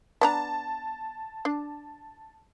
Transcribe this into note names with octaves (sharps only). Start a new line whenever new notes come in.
B3 D4 A5 A#5
D4